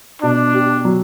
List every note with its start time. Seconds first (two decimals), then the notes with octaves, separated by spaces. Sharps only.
0.22 B2 D4
0.54 G4
0.85 F#3